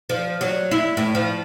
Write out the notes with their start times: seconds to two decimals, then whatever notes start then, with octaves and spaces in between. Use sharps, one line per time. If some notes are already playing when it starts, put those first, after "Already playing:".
0.09 F3
0.41 F#3
0.71 E4
0.97 A2
1.15 F3